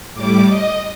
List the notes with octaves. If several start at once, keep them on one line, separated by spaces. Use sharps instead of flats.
A2 G3 D6
D#5